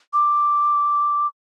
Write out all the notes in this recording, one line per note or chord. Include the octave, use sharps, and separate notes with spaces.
D6